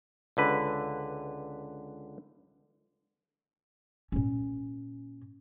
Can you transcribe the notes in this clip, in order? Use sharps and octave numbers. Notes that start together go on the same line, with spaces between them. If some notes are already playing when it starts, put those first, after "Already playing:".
C#2 D3 B4
A#2 C#4